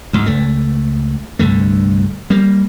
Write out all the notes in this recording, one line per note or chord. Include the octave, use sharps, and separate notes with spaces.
D2 G#2
C#2 A3
C2 G2 D3 A3
G3 A#3